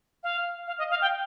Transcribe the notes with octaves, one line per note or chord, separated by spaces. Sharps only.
F5
F5
D#5
F5
G5